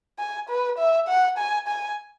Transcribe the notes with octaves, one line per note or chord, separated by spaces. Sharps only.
G#5
B4
E5
F#5
G#5
G#5